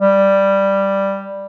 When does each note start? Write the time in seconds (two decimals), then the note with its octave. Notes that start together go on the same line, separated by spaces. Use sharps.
0.01 G3